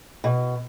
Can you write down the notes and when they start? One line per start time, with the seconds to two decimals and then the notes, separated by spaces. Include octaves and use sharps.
0.24 B2